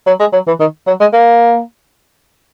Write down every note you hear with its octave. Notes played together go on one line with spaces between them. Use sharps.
F#3
G#3
F#3
E3
D#3
F#3
G#3
A#3